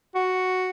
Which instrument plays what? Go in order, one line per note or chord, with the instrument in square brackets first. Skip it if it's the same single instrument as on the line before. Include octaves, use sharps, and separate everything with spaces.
[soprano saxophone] F#4